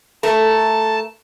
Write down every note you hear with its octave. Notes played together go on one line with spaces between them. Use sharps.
A3 A#4 A5